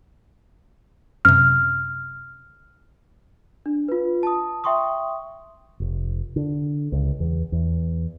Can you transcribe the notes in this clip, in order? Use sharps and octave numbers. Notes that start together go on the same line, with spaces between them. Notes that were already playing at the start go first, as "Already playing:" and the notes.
F#2 C3 F6
D4
F4 B4
A5 D#6
E5 G5 C6 C#6 D#6
F1
D3
C#2
E2
E2